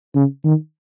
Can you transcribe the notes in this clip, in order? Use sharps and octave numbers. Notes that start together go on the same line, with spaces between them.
C#3
D#3